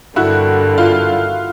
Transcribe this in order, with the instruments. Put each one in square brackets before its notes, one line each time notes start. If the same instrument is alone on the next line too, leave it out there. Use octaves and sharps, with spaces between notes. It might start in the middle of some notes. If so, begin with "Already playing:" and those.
[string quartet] G2 D3 G3 A#3 [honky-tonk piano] E4 F#4
[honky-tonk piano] F4